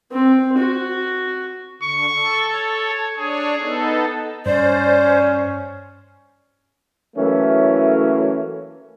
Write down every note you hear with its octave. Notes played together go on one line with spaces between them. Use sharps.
C4
F#4
D3 C#6
A4
C#5
D4 G#4 C#5
B3 D#4 A4
G2 C#4 C5 D5
E3 F#3 A3 A#3 C#4 E4